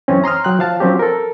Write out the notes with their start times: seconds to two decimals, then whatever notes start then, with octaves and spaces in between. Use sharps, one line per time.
0.08 F#2 E3 C4 C#4
0.24 A#5 C6 D#6 F6
0.44 F#3 G5 F#6
0.59 F3 F5 A5
0.80 F3 F#3 C4 C#4 G4
0.99 A4 A#4